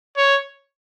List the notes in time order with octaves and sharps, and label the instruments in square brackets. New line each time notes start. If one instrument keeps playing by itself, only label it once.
[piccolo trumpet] C#5